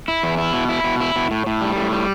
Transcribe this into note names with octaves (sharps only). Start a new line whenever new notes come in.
E4
E2
E4
B2
E4
B2
E4
B2
A2
A2
G3
A2
G3